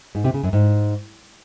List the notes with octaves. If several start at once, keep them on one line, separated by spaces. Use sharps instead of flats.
G#2
C3
C#3
F#2
G#2